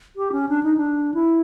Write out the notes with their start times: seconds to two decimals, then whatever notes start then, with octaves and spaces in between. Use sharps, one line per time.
0.16 G4
0.32 C#4
0.49 D4
0.63 D#4
0.77 D4
1.14 E4